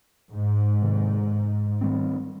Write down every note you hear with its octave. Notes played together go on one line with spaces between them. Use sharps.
G#2
C3 D#3 G#3
D#3 G3 C4